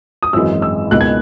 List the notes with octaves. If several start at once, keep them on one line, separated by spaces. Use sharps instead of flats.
D#6
G#1 F#2 E3 G#3 E6
E6
C#2 B2 A#3 D#4 F#6
G#6